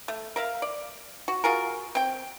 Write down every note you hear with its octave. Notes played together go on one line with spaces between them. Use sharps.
A3
A#4 E5 F5
D5
F#4
F4 F#4 G#4 A#4
C4 G5